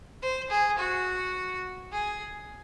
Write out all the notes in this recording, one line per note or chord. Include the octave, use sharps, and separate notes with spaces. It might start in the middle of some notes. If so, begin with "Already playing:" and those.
C5
G#4
F#4
G#4